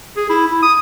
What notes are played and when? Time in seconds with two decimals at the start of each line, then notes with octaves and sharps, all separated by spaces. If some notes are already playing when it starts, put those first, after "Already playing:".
0.17 G#4
0.30 E4
0.46 E4
0.63 D#6